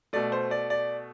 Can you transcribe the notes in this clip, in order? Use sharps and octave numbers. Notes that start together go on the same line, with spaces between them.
B2 A3 D5
C5
D5
D5